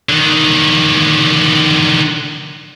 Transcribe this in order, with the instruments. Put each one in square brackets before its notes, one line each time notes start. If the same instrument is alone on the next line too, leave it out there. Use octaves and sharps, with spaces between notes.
[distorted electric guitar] D3 D#3